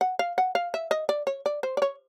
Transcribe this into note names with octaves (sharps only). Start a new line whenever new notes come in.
F#5
F5
F#5
F5
E5
D#5
D5
C#5
D5
C5
D5
C#5